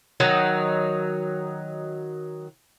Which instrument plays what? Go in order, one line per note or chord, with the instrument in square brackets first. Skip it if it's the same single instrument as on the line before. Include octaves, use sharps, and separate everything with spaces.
[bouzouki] D#3 F#3 D#4